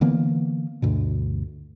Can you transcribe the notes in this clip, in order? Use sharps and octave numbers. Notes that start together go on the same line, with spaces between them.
D3 E3 A#3 B3
D2 G2 B2